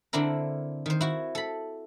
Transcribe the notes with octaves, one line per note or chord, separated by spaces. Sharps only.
D3 C4 D4 E4 A#4
D#3 C5
E4 F#4
A4 B5